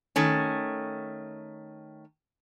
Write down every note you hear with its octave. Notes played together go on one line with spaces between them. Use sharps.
D#3 A3 C#4